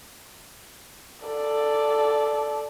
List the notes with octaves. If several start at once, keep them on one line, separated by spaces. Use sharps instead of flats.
A4 D5